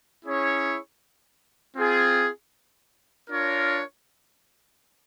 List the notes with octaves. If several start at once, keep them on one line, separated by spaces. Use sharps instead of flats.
C#4 E4 G#4 C#5
C4 F4 G#4
D4 F4 A#4 C#5